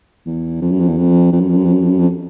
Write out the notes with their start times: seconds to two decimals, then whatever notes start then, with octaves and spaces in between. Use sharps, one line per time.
0.26 E2
0.61 F2
0.71 F#2
0.80 F2
0.88 E2
0.97 F2
1.32 F2
1.40 F#2
1.49 F2
1.56 F#2
1.65 F2
1.73 F#2
1.82 F2
1.90 F#2
1.99 F2